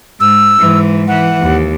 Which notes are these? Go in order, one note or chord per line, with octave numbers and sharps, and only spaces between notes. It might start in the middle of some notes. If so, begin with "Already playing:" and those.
G#2 E6
G#2 E3
E3 F#5
D#2